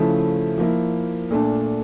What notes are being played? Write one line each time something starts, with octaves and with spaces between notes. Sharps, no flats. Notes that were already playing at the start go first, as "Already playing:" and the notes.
Already playing: C#3 F3 A3 E4
F3 A#3 E4
A#2 A3 D4